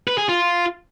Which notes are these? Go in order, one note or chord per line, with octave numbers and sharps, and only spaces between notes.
B4
G#4
F4